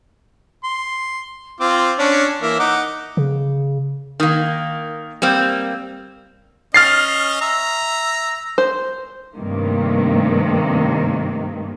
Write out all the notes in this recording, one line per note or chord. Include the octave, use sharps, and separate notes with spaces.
C6
C4 F4 D6
C#4 D4 C#5
E3 A#3 E5
D#4 F#5 D6
C#3
D#3 A#3
G3 A#3 C4
C#4 D#5 F6 A6 C7
E5 A#5
C5
G2 C3 D#3 A3 A#3